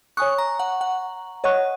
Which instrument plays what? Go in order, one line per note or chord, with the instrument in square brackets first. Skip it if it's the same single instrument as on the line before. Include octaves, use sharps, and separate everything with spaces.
[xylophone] C#5 G#5 D#6 F#6 [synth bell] C#6
[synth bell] A#5
F#5
F#5
[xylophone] C#5 F#5 C#6 F#6 [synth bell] D#5